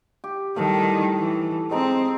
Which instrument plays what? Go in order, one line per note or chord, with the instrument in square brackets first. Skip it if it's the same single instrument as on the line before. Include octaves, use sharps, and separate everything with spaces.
[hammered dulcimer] G4
[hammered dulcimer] A2 A4 A5 [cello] D#3 G3
[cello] E3
[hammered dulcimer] G#3 D#4 [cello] C4